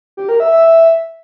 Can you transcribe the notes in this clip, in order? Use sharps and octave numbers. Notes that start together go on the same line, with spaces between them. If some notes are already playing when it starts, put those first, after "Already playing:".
G4
A#4
E5
E5